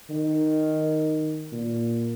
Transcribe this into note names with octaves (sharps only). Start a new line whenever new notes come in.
D#3
A#2